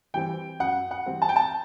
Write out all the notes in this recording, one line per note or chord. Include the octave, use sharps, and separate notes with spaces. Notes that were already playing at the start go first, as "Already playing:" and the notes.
E3 G3 C4 G5
F#2 F#5
F#5
E3 G3 C4
A5
G5
A5